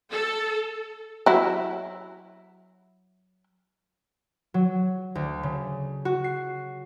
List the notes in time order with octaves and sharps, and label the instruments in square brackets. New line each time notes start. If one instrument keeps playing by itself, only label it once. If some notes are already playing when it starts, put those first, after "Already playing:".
[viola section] A4
[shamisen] F#3 E4
[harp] F#3
D2
C#3
F#4
C7